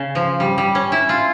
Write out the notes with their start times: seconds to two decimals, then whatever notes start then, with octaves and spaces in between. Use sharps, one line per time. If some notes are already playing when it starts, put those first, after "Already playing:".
Already playing: C#3
0.15 F3
0.40 G3
0.58 G3
0.75 C#4
0.92 E4
1.09 F4